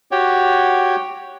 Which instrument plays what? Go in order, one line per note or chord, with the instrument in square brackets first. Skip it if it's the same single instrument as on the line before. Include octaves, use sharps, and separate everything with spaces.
[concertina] F#4 G4 C#5 G5